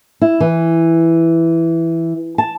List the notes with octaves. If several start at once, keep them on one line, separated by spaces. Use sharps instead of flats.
E4
E3
A5